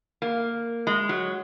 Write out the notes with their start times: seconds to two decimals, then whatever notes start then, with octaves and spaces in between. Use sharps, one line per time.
0.22 A#3
0.87 G#3
1.09 F#3